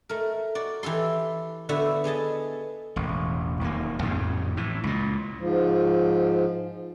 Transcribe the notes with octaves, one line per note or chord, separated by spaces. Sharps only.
A3 A#4
F#4 D5
E3 G4 A4 C6
D3 B3 E4 F#4 E5
B3 G#4 D#5 A5
E1 A1
D1 D#2 A#3
A1 F2 G#2 C#3
A2 E3
C#2 A#2
G#2 F3